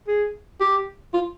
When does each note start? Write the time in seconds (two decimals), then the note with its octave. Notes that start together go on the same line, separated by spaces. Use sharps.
0.08 G#4
0.61 G4
1.14 F4